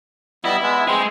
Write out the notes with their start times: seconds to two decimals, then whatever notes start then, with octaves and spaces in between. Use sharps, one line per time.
0.44 G3 B3 E4 D#5
0.63 G#3 B3
0.88 G#3 C4 G#4 C5 G5